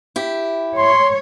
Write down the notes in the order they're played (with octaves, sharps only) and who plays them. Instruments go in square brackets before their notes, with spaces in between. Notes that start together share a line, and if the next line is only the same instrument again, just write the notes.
[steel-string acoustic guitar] E4 G4
[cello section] C#5 [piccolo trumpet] C6